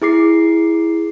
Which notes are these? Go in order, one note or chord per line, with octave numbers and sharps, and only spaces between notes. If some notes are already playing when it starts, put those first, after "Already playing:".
E4 G#4 D6 C7